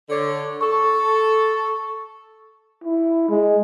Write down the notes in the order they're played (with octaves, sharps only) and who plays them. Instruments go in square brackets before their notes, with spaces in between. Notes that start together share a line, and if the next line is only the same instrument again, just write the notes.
[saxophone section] D3 C#5
[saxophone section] A4 [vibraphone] C#6
[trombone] E4
G#3